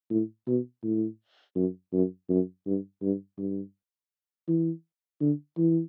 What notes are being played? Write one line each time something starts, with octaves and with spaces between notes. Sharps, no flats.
A2
B2
A2
F#2
F#2
F#2
G2
G2
G2
E3
D3
E3